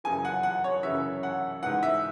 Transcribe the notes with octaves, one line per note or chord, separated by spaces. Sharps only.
F#2 C#3 E3 G#5
F#5
F#5
C#5
F#2 C#3 E3 E5
F#5
G#2 E3 F#5
E5